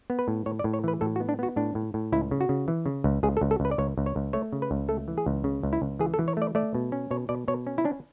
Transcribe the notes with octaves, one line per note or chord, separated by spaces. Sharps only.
B3
B4
A2
A2 C#5
D5
A2
C#5
E3 B4
A2 A4
F#4
B3
D4
B3 F#4
A2 D4
A2
A2
C#2 E4
C#3
F#4
C#3
E3
C#3
C#2
C#2 G#4
A4
C#2
A4
C#2 B4
D5
C#2 C#5
C#2
C#5
C#2
A3 C#5
C#3
B4
C#2
A3 A4
E3
G#4
C#2
C#3
C#2
E4
C#2
E3 G#4
A4
E3
C#5
A3 D5
A3 D5
B2
C#4
B2 C#5
B2 D5
B2 C#5
C#4
E4
C#4 D4